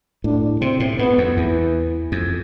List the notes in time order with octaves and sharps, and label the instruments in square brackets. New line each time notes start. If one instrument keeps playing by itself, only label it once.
[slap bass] A2 [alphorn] D4
[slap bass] C3 [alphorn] C4
[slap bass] A2
[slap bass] G#2 [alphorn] B3
[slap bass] F2
[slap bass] E2 [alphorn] E3
[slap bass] F2